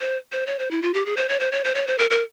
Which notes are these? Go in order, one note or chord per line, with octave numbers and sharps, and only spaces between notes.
C5
C5
C#5
C5
E4
F4
G4
G#4
C5
C#5
C5
C#5
C5
C#5
C5
A#4
A#4